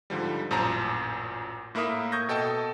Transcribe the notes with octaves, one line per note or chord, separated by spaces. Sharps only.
G#2 D3 F3 G3
A1 F#2 A#2 C5 A5 A#5
A2 A#3 E4 A#4 E5 D#6
C#6 D#6 G6 G#6 A#6
B2 A4 D#5 G5 A5